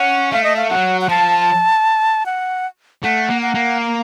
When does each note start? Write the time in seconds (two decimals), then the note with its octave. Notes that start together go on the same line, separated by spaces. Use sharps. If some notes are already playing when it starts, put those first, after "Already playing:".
Already playing: C#4 F#5
0.32 A3 F5
0.44 D#5
0.56 F5
0.70 F#3 F#5
1.01 F#5
1.09 F3 A5
2.26 F#5
3.03 A3 F#5
3.30 A#3
3.42 F#5
3.54 A#3
3.80 F5